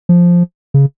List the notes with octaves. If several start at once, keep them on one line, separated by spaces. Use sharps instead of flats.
F3
C#3